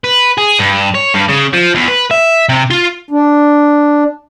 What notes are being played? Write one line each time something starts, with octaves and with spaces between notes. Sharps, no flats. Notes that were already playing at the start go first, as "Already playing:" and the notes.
B4
G#4
G2
C#5
G2
C#3
F3
E2
B4
E5
C3
F4
D4